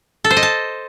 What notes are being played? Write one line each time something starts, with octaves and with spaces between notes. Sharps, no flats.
A4
C5
D#5
A5